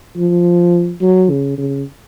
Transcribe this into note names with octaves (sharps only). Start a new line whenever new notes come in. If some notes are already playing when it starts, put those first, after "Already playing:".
F3
F#3
C#3
C#3